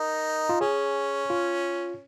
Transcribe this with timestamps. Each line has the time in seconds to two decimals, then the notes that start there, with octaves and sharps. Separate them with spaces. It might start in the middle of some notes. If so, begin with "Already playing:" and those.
Already playing: D#4 A#4
0.49 F4
0.61 C#4 G#4
1.30 F4